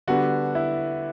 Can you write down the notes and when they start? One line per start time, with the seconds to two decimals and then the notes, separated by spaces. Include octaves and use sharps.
0.08 D3 G3 B3 D4 F#4
0.55 E4